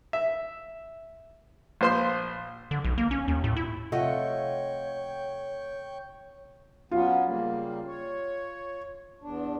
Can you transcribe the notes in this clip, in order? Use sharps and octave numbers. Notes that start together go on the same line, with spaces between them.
E5
A#1 C5 C6
D3
B1
A#3
C#4
D#2
A2
E4
C3 A3 F4 C#5 D#5 F#5 G5 C#6
F#3 B3 C#4 F4
C#3 G3 A#3
C#5
E2 D4